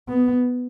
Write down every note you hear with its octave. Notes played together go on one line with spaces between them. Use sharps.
B3